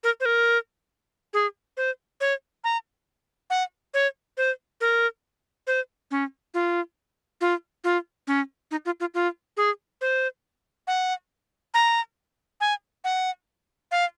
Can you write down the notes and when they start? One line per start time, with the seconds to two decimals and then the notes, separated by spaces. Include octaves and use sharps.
0.04 A#4
0.20 C5
0.25 A#4
1.33 G#4
1.77 C5
2.21 C#5
2.64 A#5
3.50 F#5
3.94 C#5
4.37 C5
4.81 A#4
5.67 C5
6.11 C#4
6.54 F4
7.41 F4
7.84 F4
8.27 C#4
8.71 D#4
8.85 F4
9.00 F4
9.14 F4
9.57 G#4
10.01 C5
10.87 F#5
11.74 A#5
12.61 G#5
13.04 F#5
13.91 F5